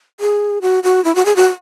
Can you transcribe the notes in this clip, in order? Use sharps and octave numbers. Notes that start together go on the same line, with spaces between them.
G#4
F#4
F#4
E4
F#4
G#4
F#4